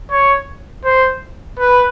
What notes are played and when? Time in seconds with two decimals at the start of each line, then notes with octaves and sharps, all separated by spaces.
0.10 C#5
0.85 C5
1.59 B4